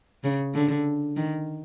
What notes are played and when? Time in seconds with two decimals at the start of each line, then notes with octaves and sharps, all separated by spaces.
0.24 C#3
0.54 D3
1.17 D#3